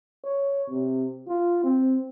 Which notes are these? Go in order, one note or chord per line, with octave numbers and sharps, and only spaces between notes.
C#5
C3
F4
C4